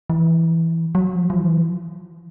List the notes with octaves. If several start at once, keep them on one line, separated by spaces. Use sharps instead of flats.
E3
F#3
F3
F3
E3